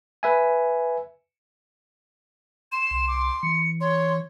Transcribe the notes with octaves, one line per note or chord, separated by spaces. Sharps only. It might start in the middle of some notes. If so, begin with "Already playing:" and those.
B4 E5 G#5
C6 E7
C2
D6
E3 C#7
C#5 C6